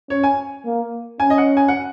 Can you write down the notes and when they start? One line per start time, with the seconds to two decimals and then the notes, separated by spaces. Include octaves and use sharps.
0.10 C#4 C#5
0.23 G#5
0.65 A#3
1.20 C#4 G#5
1.30 D#5
1.38 F#5
1.57 G#5
1.68 F#5